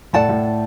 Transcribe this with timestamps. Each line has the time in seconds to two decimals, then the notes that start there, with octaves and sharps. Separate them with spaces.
0.13 A2 A4 D5 F#5 A5
0.29 A2